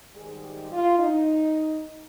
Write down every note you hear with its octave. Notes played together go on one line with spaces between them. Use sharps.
G#2 D#3 G3 G#4
G4
F4
D#4